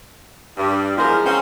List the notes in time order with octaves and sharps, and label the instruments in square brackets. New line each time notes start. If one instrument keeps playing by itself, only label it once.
[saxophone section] G2
[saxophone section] E2 F3 A#4 [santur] G#3
[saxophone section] C4 C#4 C5 [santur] F5 A#5 D#6